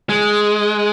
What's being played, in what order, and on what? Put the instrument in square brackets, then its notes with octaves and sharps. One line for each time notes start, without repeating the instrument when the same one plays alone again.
[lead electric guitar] G#3